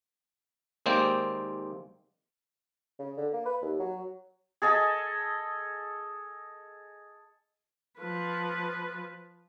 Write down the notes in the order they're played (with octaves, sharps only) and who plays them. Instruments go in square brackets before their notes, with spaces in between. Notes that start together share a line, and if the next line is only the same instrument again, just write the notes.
[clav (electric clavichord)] D#2 G#3 A#3 C4 D5 G5
[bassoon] C#3
D3
A#3
B4
D#2
F#3
[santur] G#4 A4 D#5 G#5
[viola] F3 B4